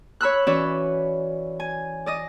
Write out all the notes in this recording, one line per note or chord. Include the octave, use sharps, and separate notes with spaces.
C#5 B5 E6 F#6
E3 C#4 F#4 C#5 D5 E5
G#5
D5 D#5 D#6